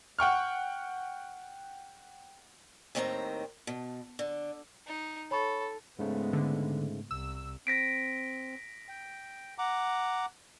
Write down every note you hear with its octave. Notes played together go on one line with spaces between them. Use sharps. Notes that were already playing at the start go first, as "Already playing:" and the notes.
F#5 G5 C#6 F6
D#2 A2 D#3 C4 E5 A#5
B2
D3
D#4
A4 C#5 B5 C#6
G#2 C#3 G#3 A3 B3
D3
C2 E6
C4 A#6 B6 D7
G5
F#5 A#5 D6